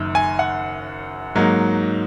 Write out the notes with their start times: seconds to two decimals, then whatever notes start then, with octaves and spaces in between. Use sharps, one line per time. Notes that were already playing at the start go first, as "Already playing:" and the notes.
Already playing: F#1 F#2 D#3
0.15 G#5
0.39 F#5
1.35 G#2 F#3 A#3 D#4